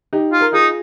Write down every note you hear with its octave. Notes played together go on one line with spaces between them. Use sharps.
D#4 G4
F4
A#4
D#4 F4 G#4